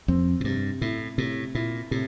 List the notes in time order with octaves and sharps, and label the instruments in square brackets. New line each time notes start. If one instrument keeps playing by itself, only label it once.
[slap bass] F2 [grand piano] C4
[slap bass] A2
[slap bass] G2 [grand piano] C3
[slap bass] A2 [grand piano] E4
[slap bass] A2 [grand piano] C3
[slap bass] A#2 [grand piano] E4
[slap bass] A2 [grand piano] C3